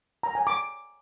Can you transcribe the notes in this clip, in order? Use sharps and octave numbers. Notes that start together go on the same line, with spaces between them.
A#5
G#5
D6